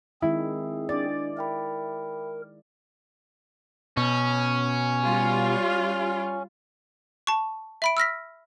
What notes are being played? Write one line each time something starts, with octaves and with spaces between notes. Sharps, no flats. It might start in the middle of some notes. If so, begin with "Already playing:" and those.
D#3 G#3 C4 E4 G#4
D4 D5 A6
A#4 E5 G5 B5
B2 C#4
G3 F4
A5 C#6
E5 B5 D7
E6 F6 A#6 B6